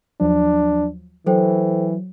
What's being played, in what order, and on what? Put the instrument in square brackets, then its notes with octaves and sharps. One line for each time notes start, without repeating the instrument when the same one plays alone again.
[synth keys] D#2 F3 F#3 [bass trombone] D4
[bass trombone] E3 [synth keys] F#3 [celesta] A4 C5 G5